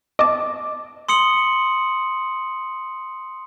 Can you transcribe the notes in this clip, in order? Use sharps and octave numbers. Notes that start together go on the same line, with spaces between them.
D#5 A5 D6
C6 D#6 C#7 F#7